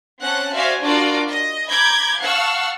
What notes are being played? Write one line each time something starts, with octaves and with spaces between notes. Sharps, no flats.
C4 C#4 F#5 A5 F#6
F#4 C5 D5 E5 F5 G#5
D4 F4 F#4 A#4 D5 D6
D#5
A#5 B5 D6 G6 G#6
F5 F#5 A5 C#6 E6 F6